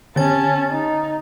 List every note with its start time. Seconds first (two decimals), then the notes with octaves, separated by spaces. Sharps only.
0.16 D3 C#4 A5 A6
0.70 D#4